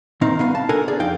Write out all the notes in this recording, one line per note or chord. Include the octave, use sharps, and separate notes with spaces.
A#2 D#3 C4 D#4
C2 B3 F5
A5
D4 A4 A#4 F#5 G#5
G#4 D5
F2 D#4 F5 G5